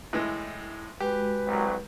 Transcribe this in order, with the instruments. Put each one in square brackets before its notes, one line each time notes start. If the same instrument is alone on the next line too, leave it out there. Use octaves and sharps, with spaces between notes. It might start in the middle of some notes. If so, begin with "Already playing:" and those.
[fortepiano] A2 E3 G#3
[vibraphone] G#3 F#4 [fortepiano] G4 [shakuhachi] B4
[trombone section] C2 F#3